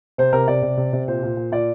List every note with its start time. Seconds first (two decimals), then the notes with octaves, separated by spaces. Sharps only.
0.18 C3 C5
0.33 C3 A#4
0.48 C3 D5
0.63 C3
0.77 C3
0.93 C3
1.08 A#2 C5
1.23 A#2
1.37 A#2
1.52 A#2 D5